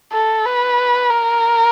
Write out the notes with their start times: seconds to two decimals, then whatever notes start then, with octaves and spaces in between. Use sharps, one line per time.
0.12 A4
0.45 B4
1.10 A#4